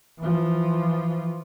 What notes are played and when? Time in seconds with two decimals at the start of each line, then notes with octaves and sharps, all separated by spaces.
0.20 E3 F3